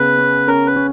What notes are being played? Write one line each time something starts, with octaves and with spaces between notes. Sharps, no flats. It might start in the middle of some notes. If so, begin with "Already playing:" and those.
Already playing: C#3 B3 B4
C#4
C#4 A#4
B4
C#4